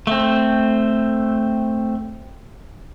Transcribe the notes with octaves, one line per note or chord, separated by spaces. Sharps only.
A3 C4